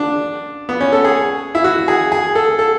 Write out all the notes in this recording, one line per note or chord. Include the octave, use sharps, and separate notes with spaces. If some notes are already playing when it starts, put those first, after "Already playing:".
Already playing: D4
B3
C#4
A4
G#4
E4
F#4
G#4
G#4
A4
A4